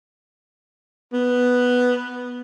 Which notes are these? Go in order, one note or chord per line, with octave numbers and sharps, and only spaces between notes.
B3